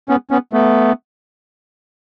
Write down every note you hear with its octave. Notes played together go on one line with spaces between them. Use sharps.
B3 C#4
B3 C#4
A3 B3